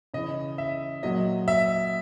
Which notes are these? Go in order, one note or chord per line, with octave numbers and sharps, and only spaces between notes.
C#3 E3 D#5
E5
A#2 F#3 D#5
E5